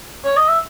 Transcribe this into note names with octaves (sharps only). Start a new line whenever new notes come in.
C#5
D#5
E5